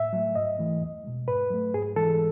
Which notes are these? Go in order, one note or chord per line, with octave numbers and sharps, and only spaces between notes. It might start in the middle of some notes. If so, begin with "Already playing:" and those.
Already playing: A2 E5
F#3 A3
G#2 D#5
E3 A3
E2
B2 G#3
G#2 B4
F#3 A3
G#2 G#4
E3 G#3 A4